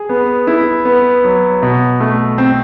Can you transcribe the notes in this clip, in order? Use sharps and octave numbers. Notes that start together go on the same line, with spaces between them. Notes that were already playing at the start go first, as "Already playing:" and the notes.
Already playing: G#4
B3
E4
B3
F#3
B2
A3
C4